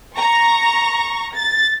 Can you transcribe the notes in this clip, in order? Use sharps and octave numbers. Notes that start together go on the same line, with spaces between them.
A#5 C#6
A6